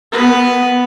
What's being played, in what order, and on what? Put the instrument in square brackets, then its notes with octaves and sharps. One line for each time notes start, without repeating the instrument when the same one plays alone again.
[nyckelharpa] B3 B4